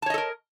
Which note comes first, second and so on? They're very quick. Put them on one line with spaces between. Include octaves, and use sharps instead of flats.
A5 C#5 D#5 A4 A#4